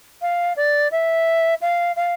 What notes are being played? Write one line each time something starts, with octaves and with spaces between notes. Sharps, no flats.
F5
D5
E5
F5
F5